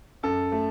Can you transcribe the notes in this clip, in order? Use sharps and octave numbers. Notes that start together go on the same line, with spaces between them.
F#2 A4
A3